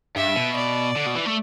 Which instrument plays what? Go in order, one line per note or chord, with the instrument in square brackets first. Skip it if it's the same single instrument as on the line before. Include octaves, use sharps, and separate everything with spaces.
[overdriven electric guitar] G2 [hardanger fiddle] E5
[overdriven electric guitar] B2
[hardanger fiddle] D5
[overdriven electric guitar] D3
B2
E3
A3